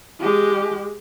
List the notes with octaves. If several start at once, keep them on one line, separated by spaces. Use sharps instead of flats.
G#3 G4